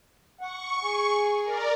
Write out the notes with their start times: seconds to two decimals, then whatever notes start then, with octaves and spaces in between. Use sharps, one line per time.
0.41 F#5 C#6
0.82 G#4
1.43 A#4 D5